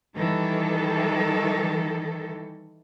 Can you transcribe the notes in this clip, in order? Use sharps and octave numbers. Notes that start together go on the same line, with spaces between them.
D#3 E3 G3 A4